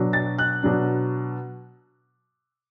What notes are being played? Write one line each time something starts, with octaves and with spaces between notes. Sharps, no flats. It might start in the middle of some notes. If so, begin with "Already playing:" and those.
Already playing: B2 F#3 D4
A6
F#6
B2 F#3 D4